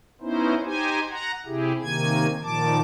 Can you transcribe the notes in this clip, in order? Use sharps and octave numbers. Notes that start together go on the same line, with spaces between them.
B3 C#4 D#4 E4 C5
D#4 G4 C5 G#5
F#5 A#5
C3 E4 G4 G#4
C3 D#3 A#3 G#5 G#6
A#2 D#3 F3 A5 D6